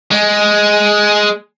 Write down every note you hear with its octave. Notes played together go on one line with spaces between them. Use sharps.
G#3